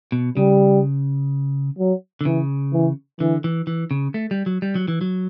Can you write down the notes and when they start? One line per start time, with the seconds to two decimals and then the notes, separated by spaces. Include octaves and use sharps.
0.12 B2
0.37 C#3 G3
1.78 F#3
2.21 D3
2.25 C#3 E3
2.73 E3
3.20 D3 E3
3.44 E3
3.67 E3
3.91 C#3
4.14 A3
4.31 G3
4.46 F#3
4.62 G3
4.76 F#3
4.88 E3
5.01 F#3